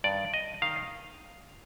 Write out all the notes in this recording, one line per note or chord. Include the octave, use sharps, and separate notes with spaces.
G2 D#3 D5
D#5
D#3 F5